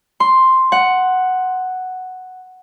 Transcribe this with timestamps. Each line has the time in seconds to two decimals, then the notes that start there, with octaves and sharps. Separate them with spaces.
0.20 C6
0.72 F#5